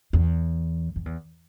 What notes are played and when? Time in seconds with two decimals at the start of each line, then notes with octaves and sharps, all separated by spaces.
0.13 E2
0.96 F2
1.05 E2